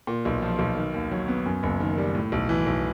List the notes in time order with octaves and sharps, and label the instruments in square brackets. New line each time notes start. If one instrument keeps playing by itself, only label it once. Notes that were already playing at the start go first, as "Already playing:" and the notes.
[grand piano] A#2
B1
F3
B1
D#3
D#2
F#3
B3
F#2
F#1
D#3
G3
A2
B1
E3
B1